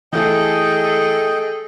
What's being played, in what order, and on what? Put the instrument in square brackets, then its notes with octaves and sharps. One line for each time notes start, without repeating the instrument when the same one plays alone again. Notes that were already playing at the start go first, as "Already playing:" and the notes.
[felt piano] E3 A3 [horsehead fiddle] G#4 A4 [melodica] D#5 G5